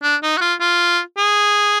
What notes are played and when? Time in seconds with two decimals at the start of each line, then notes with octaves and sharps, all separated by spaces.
0.03 D4
0.23 D#4
0.37 F#4
0.41 F4
0.60 F4
1.17 G#4